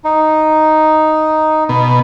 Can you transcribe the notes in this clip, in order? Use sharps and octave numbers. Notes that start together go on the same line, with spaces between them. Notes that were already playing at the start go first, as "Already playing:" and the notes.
D#4
B2